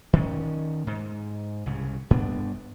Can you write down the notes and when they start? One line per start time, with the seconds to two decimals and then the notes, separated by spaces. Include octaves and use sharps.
0.13 D#3 C#4
0.87 G#2
1.66 C2 C#3
2.11 G2 B3 D4